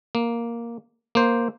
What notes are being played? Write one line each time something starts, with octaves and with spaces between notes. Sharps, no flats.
A#3
A#3 C5